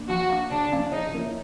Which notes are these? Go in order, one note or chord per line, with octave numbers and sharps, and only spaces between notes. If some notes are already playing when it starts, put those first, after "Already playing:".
Already playing: A#3 D4
F3 F#4
A#3 D4
C#3 D4
F3 A#3 C#4 E4
C#3 D#4
F3 A#3 C#4 E4